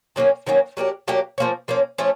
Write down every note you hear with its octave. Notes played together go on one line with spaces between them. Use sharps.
D#3 F#3 A#3 C#4
D#3 F#3 A#3 C#4
F#3 A#3 D4 G4
F#3 A#3 D4 G4
F3 A#3 C#4
F3 A#3 C#4
F3 A3 C#4